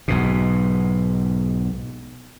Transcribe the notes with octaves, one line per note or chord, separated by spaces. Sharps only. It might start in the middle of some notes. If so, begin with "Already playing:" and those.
B1 G#2 B2